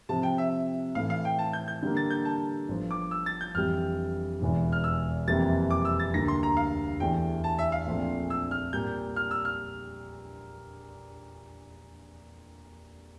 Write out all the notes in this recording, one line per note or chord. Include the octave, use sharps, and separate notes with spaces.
C3 F3 C4 A5
G5
E5
A2 E3 A3 F5
F5
G5
A5
G6
G6
D3 G3 A#3
A6
G6
A5
G1 G2 F3
D6
E6
A6
G6
F2 E3 G3 F6
E1 E2 E3
F6
E6
F2 C3 E3 G3 A#3 A6
D6
E6
A6
D2 D3 G3 A#3 A#6
C6
A#5
F5
E2 E3 A3 E4 G4 G5
A5
E5
F5
A#1 A#2 F3 A3 C4
E6
F6
A#2 G3 A#3 G6
F6
E6
F6